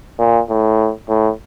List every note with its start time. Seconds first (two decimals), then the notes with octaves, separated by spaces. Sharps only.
0.19 A#2
0.49 A2
1.09 A2